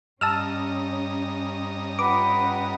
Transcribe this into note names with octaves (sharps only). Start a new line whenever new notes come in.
G2 C#4 D#5 A5 A#5 E6 F6
C#4 F4 B4 F#5 G5 D6